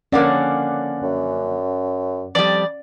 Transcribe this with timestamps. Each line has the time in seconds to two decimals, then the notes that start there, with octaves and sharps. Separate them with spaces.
0.12 F2 D3 A#3 C#4 D5 F#5
1.03 F#2
2.35 F2 G3 D5